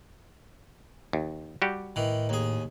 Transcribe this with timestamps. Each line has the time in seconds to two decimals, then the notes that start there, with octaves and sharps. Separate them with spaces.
1.13 D#2
1.62 G3 F#4 G4
1.96 A2 D#3 E3
2.29 D#2 G#4